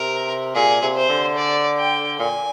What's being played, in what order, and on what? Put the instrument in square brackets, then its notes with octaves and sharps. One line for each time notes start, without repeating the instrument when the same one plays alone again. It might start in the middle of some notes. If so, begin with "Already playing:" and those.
Already playing: [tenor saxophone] C3 [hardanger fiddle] A#4
[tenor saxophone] A#2 [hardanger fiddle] G#4
[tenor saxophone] C3
[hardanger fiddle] C5
[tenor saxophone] D3
[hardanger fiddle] D5
G5
[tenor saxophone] A#2 [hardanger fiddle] G#5